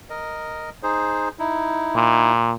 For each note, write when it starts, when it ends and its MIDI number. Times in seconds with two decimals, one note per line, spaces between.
0.10 0.70 70
0.10 0.70 75
0.83 1.29 63
0.83 1.29 68
0.83 1.29 72
1.39 2.33 63
1.39 2.33 64
1.96 2.53 46